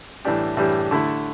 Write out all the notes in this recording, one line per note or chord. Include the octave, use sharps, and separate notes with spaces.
A2 E3 G3 D4 G4
A2 E3 G3 D4 G4
D3 A3 E4